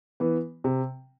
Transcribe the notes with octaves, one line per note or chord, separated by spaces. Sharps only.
E3 B3
C3